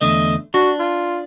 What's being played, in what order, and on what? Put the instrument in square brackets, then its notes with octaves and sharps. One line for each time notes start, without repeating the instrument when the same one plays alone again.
[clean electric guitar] E2 D3 A3 [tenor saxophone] D#5
[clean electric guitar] D4 [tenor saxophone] F#4
[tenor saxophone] F4